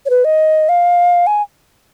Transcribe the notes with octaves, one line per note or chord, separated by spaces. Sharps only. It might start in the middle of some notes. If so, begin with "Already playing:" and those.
C#5
B4
D#5
F5
G#5